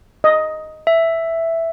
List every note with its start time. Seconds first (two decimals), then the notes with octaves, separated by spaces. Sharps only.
0.24 D#5
0.87 E5